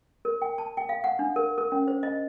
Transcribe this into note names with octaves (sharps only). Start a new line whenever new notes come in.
A#4
G5
A5
G5
F5
F#5
D4
A#4
A#4
C#4
C5
D#5